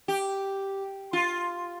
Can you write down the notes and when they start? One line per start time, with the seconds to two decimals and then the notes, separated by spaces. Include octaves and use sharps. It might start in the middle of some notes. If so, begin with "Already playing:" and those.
0.08 G4
1.13 F4